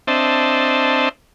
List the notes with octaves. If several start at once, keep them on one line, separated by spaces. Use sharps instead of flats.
C4 D4 C5 D#5 E5 A5